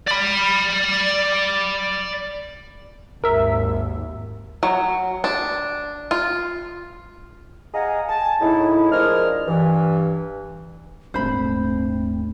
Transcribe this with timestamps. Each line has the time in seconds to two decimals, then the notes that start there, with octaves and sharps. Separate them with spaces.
0.08 D5 B5
3.24 G#1 D#2 A#4 E5
4.63 F#3
5.24 D4
6.11 F4
7.74 G#4 D#5 F5 F#5 G#5 A#5
8.09 G#5 A5
8.41 A2 C#3 D#4 E4
8.91 F3 G#3 D4 G#4 A#4 F6
9.48 G2 E3
11.14 D#1 G#2 A3 C4 D4 C5 B5